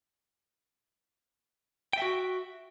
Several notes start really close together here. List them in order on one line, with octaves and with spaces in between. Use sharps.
G5 E5 F#4